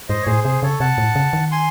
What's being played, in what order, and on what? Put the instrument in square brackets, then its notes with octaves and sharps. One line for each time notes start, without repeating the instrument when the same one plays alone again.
[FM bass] G#2 [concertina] C5 D#5
[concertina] C#5
[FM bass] A2 [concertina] G#4 C5
[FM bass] C3 [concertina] G#4 C5
[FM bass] C#3 [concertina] A4 C#5
[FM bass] C3 [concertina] F#5 A5
[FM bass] A2
C#3
D#3
[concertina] G#5 C6